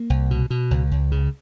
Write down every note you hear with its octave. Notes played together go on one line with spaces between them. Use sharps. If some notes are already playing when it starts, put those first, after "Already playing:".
Already playing: A#3
C2
B2
B2
C#2
C#2
C#3